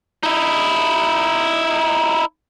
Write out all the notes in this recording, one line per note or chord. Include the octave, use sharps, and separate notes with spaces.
D#4 E4